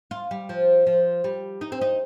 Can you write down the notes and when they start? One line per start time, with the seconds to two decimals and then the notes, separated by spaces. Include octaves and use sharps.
0.11 F4
0.31 G3
0.49 F3
0.87 F3
1.24 G3
1.61 D#4
1.72 C4
1.81 D#4